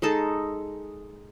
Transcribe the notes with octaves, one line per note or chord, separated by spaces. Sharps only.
G#3 D#4 A4 A5